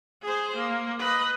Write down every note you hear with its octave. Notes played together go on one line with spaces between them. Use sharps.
G#4 C5
A#3
B4 D#5